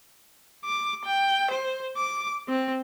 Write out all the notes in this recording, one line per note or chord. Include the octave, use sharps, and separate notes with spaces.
D6
G5
C5
D6
C4